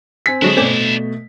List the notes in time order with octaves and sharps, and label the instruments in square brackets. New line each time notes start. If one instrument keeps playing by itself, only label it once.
[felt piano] C4 G#5 B6
[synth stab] D3 F#3 G#3 [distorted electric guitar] D4 E4
[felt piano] B2 A3 [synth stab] C4 C#4 D5